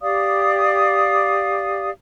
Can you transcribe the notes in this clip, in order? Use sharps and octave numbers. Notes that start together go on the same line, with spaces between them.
G4 D5 F5 D#6